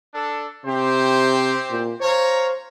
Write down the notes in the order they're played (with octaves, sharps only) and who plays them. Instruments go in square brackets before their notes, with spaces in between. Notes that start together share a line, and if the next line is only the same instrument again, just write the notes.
[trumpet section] D4 A4
[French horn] C3 [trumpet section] C4 G4 C5
[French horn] A#2
[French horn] C5 [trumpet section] C#5 F5 A#5